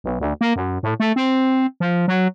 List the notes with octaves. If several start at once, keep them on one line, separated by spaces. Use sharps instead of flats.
B1
D2
A#3
F#2
A2
A3
C4
F3
F#3